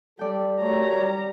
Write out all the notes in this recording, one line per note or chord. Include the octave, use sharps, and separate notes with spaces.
G3 A4 D5 G5
A3 F#4 G4 A#4 C#5 A#5
G3